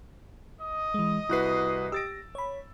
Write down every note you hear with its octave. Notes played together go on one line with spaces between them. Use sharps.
D#5 D#6
E3 G#3
C2 E4 F#4 B4 F#6 C7
G4 E6 A6 A#6 D7
C#5 B5